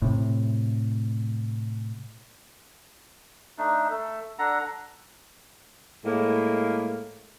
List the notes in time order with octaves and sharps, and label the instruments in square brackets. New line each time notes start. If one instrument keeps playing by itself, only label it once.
[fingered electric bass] A2 C3
[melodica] A3 D4 D#4
A3 A4
D4 A4 F#5 A#5
[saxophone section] A2 G#3 A#3